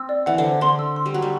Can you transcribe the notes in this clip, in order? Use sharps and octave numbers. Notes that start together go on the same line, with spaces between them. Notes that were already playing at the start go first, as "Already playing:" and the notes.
Already playing: C4 E6
D5
E3 F#5
D3
C5
D3 C6
E6
C6
G3
F#3 F#5
G3